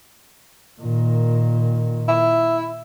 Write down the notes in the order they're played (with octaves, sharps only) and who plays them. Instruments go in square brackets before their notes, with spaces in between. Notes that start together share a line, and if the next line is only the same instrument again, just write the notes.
[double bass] A#2 D#3
[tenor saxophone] E4